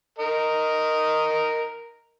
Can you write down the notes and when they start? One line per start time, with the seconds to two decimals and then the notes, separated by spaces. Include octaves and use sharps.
0.19 A#4 D#5